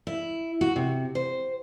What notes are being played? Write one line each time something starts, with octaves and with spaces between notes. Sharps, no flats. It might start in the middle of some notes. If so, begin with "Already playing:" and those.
E4
F#4
C3
C5